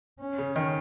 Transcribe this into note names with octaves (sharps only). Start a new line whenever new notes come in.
C#4
C#3
D#3